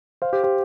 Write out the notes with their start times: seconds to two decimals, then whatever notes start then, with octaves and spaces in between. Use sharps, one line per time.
0.22 C5 F5
0.33 G4 C5
0.44 G4 C5